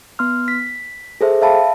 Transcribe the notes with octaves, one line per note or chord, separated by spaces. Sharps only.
B3 C6 F6
B6
G#4 A4 C5 E5
E5 F5 A5 B5